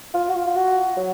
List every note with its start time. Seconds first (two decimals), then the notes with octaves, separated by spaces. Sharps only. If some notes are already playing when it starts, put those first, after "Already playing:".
0.14 F4
0.29 F#4
0.35 F4
0.47 F4
0.56 F#4
0.97 F#3